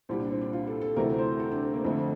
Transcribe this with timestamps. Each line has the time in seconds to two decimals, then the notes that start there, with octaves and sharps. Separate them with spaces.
0.09 C2 A#2 G3 C4
0.20 D4
0.31 C4
0.41 D4
0.53 F4
0.67 A4
0.81 A4
0.96 D2 C3 E3 A3 A#4
1.18 C5
1.40 A4
1.52 D4
1.74 A#3
1.84 F2 D3 A3 C4